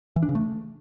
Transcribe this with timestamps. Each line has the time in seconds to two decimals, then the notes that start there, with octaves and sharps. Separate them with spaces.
0.16 E3
0.23 D4
0.29 C#3
0.35 A3